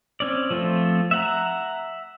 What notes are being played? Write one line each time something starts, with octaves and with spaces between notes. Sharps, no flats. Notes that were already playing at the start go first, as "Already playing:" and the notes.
C4 C#4 D5
F3 A3 C4 F4
E5 F#5 A#5